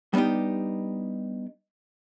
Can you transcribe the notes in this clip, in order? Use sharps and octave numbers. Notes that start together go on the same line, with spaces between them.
G3 B3 D4 D#4 G4